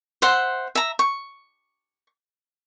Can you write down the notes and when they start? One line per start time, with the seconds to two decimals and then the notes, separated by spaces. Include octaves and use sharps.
0.22 C5 E5 F#5 C6
0.75 E5 A#5
0.99 C#6